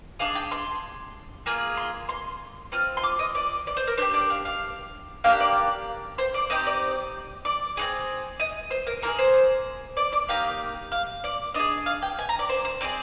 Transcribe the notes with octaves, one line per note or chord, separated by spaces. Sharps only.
D4 G#4 F5
G5
C6
A#3 F4 G#4
C6
C6
C4 F4 F6
C6
D6
D#5
D5
D5
C5
A#4
D4 G4 C5
D5
F5
F5
A#3 D4 G4 F5
D5
C5
D5
C4 D#4 G4 D#5
D5
D5
C4 F4 G#4
D#5
C5
A#4
A#3 F4 G#4 A#4
C5
D5
D5
A#3 D#4 G4 F5
F5
D5
D4 G#4 D#5
F5
G5
G#5
A#5
D5
C5
C5
C4 D#4 G#4 D5